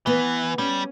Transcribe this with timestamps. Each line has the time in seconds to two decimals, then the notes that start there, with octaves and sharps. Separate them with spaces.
0.06 E3 B3
0.58 G3 C#4